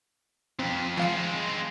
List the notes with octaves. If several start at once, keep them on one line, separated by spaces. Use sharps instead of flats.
F2 C4
F3 G#3 C4 F5 C#7